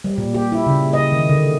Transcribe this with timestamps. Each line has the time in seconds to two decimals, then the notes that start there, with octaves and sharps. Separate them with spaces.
0.04 G3
0.18 A#2
0.34 G4
0.52 E4
0.67 C#3
0.93 D#5
1.12 D#3
1.30 D3